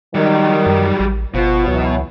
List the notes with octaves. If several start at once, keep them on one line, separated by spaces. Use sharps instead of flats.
D#3 F#3 G3
F#2
A1
G1 B2 F3
C#2 E3 F#3